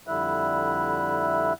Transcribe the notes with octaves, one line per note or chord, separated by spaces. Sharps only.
F2 D3 G3 E4 E5 F#6